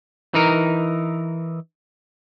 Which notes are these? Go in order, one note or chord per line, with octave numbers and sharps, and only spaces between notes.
E3 D#4 A#4